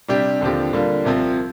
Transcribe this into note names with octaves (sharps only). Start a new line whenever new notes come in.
C3 G3 D4 G4
D#2 D3 F3 C4 G4
D3 G3 A#3 F4
C2 C3 F3 C4